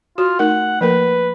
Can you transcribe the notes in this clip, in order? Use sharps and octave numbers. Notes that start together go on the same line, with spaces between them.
F4 F#4
A3 D#4 A#4 F#5
F3 A#3 A#4 B4